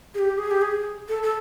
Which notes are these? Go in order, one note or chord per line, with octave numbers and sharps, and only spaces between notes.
G#4
G4
G#4
G4
G#4
A4
A4